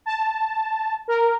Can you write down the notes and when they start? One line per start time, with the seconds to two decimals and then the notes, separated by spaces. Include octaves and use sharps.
0.06 A5
1.08 A#4